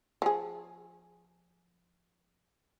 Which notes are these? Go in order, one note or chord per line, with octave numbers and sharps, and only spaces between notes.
F3 G#4